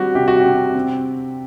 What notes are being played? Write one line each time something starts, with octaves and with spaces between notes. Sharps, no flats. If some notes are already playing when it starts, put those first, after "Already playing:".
Already playing: G3 C4 F#4 G4
C3 G4
F#4
G4
C3
C4